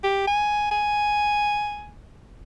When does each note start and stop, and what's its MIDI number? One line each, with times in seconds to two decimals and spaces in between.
0.04 0.26 67
0.27 0.67 80
0.71 1.91 80